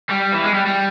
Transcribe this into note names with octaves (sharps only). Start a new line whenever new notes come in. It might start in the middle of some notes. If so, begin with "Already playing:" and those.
G3
E3
G#3
G3
G3